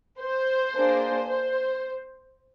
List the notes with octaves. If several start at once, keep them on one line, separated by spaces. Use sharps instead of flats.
C5
A#3 D4 G#4
C5